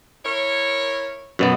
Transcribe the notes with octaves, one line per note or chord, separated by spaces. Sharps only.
E4 A#4 C#5
F#2 B2 B3